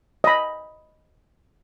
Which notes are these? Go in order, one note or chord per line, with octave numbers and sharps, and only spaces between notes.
D#5 B5